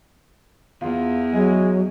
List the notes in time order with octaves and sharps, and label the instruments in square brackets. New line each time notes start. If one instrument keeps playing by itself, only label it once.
[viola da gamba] E2 [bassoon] F4
[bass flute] F#3 [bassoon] G#3